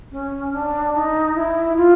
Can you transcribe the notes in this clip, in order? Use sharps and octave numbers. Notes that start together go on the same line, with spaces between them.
C#4
D4
D#4
E4
F4